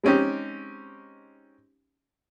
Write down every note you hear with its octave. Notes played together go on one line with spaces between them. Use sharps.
G#3 C4 C#4 D#4 G4